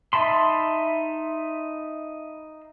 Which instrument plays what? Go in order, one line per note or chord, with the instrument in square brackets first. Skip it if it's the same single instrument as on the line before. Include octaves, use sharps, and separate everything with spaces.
[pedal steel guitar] D#4 E5 A5 B5 C6